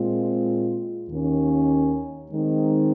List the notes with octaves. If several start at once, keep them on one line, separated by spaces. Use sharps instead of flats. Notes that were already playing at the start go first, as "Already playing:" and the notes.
Already playing: A#2 G#3 C4 F4
D#2 D#3 A#3 C#4
D#3 G#3 C4 D#4